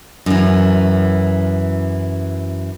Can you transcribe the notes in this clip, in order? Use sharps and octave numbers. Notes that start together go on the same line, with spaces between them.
F#2 E3